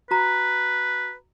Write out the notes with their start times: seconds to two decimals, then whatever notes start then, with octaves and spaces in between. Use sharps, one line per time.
0.11 F#4 B4 A#5